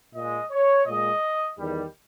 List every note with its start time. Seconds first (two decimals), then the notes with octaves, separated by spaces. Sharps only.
0.14 A#2 G#3 D#5
0.51 C#5
0.86 A#2 G#3 D#5
1.58 E2 D#3 G3